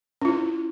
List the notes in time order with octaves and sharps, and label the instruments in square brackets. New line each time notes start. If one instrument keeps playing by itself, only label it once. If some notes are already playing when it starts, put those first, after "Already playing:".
[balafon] C#4
F4
E4